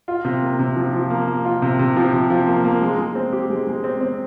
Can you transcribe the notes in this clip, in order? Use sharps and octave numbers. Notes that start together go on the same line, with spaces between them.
F4
C3
A#3
C3
F3
F3
A#3
A#3
F4
C3
C3
F3
C3
F3
A#3
A#3
G#3
G#3
C4
G4
G#3
G#3
C4
C4